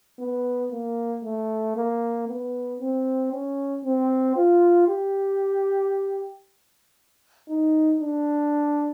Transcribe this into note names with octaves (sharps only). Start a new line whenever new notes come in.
B3
A#3
A3
A#3
B3
C4
C#4
C4
F4
G4
D#4
D4